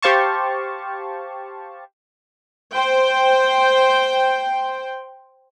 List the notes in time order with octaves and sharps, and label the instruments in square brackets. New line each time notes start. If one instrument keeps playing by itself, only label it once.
[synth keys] G4 C5 F5 A5 C#6
[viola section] C5 G5